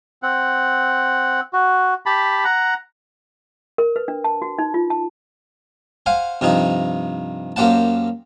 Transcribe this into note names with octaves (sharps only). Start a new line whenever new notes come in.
C4 F#5
F#4
G4 A5 B5
F#5 A#5
A#4
B4
D4
A5
F#4
D#4
F4
A5
C5 F5 F#5 G#5
G2 C3 F3 D#4
F#2 A#3 G4 C5 F#5 A5